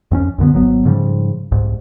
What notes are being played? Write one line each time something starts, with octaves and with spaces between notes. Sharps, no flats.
F2 C4 C#4
C2 F#2 D3 B3
G#1 F#3 B3
G#2 C#3 F3 G3
C2 G#2